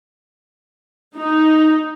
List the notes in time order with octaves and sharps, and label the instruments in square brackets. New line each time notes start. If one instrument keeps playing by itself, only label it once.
[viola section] D#4